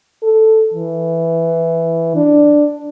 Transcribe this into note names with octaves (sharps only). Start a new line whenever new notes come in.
A4
E3
D4